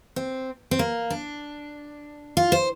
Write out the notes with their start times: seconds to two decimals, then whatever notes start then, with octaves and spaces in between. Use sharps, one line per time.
0.16 C4
0.71 C4
0.79 A#3
1.10 D4
2.37 F4
2.52 C5